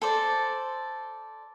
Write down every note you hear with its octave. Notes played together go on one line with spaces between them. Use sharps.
A4 C5 D5